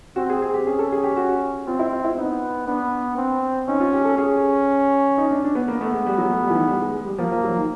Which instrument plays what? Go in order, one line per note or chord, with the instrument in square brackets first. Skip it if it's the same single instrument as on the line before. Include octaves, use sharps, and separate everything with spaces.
[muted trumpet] C4 [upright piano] F#4
[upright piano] G#4
G#4
G4
[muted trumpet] C#4 [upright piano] G#4
[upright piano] A4
G#4
G4
F#4
[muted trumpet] C4 [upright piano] F4
[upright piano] E4
F4
E4
[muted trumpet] B3 [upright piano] D#4
[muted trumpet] B3 [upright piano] D4
[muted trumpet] C4
[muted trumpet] C#4 [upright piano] D#4
[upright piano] F4
G4
A4
[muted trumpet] C#4 [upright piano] G#4
[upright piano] D#4
D4
D4
B3
[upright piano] A#3 [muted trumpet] B3
[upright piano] A3
G#3
G3
F#3
A3
G3
E3
D#3
G3
G#3
G#3
G3
[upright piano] F3 [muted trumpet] A#3
[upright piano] F3
F#3
D#3